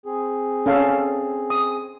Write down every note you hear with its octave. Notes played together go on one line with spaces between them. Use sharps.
C4 G#4
C#4 A4 F5
D#6